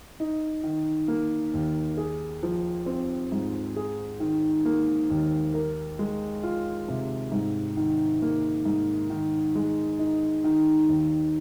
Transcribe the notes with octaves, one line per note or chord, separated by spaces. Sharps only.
D#4
D#3
A#3
D#2
G#4
F3
C4
G#2
G#4
D#3
A#3
D#2
A#4
G#3
F4
C3
G#2
D#3
A#3
G#2
D#3
G#3
D#4
D#3
D#2